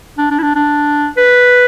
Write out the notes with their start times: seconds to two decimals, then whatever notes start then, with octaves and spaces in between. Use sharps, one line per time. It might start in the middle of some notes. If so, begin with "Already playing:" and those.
0.18 D4
0.31 D4
0.38 E4
0.42 D4
0.55 D4
1.17 B4